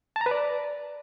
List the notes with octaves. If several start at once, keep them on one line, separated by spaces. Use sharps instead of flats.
A5
A#5
B4
D5